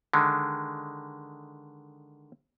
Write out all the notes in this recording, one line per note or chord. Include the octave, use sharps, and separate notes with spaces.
D3 D#3 G#3